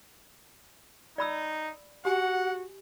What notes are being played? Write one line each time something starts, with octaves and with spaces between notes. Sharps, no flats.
D#4 D5 B5 E6
F#4 G4 F#5 G#5